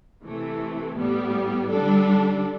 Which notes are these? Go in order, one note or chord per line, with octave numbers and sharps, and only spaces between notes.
C3 E3 A3
A2 G3 B3
D3 G3 D4 A4